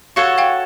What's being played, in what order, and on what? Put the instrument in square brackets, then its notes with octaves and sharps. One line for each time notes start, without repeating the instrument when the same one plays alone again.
[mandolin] F#4 A4 C#5 F#5 [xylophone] F5
[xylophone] F5 G5